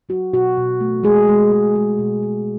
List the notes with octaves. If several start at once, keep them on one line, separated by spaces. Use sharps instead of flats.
F#3 F#4
B2 F#4
B2
A3
G#3 G#4
G#3
G#3
G#3
B2
G#3